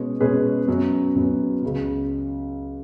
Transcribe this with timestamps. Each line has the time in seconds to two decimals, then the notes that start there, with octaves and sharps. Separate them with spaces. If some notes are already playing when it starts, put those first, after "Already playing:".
Already playing: B2 G#3 C#4 G#4 B4
0.20 B2 G#3 C#4 G#4 B4
0.68 F#2 F#3 B3
1.15 F#2 F#3 B3
1.63 C#2 C#3 F#3